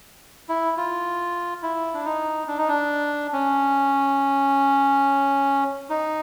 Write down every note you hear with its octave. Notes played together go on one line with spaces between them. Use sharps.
E4
F4
E4
D4
D#4
D4
D#4
D4
C#4
D#4